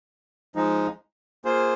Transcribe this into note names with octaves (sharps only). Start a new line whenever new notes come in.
F3 G#3 D#4
A#3 F4 G#4 C5